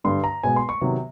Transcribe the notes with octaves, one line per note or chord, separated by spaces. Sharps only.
G2 D3 G3 C6
A#5
B2 G#3 B3 G#5
C6
C#6
C3 D#3 F#3 B3